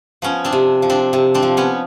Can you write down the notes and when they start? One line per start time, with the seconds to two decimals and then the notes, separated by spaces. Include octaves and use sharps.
0.22 F3 B3 C#4
0.44 C4 D4
0.52 C3
0.82 F3
0.90 C4 D4
1.13 C3
1.34 C4 D4
1.43 F3
1.57 B3 C#4